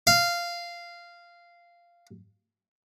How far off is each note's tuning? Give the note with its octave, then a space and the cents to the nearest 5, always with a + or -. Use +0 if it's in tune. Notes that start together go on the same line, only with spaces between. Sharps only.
F5 -10